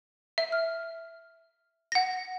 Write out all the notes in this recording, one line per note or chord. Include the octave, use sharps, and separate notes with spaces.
E5
F6
F#5 A#6